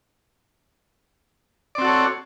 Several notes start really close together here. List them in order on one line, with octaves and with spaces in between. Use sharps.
D5 C4 F#4 A4 C#5